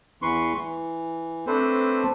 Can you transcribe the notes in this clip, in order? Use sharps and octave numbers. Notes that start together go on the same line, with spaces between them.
E2 E3 B4 C6 C#6
E3
A3 C4 D4 A4 B4 C5